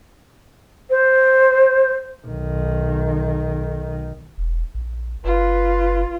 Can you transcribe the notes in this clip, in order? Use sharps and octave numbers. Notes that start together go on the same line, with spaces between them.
C5
B1 D#3
E1
A#1
F#1 F4 B4